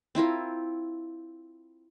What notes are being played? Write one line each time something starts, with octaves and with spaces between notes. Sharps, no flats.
C4 E4 F4 A#4